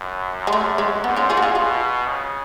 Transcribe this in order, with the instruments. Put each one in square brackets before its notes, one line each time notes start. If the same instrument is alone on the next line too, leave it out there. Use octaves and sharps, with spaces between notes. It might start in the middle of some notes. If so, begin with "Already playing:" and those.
Already playing: [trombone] F#2
[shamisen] G#3
[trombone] F#2 [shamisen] A3
[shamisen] G#3
[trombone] G#2 [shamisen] B3
[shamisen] C#4 F4
F4 G#4
F#4
F4 G#4
[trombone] B2 [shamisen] F4 G#4
[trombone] C#3